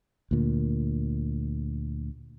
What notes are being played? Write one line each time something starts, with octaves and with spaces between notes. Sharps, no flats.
D2 A#2